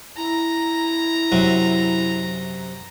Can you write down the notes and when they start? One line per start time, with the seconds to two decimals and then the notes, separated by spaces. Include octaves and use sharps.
0.17 E4 A#5
1.32 F#2 C3 F#3